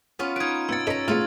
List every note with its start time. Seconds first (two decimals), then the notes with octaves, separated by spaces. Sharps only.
0.19 B3 C#4 F4
0.36 D#4 B4 G#6 D7
0.69 B3 F#5 E6 G#6 A6
0.87 C#4 A4 B4 D#5 A#5
1.08 A2 C#3 B3 F4